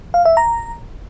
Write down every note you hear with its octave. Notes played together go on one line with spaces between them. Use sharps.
F5
E5
A#5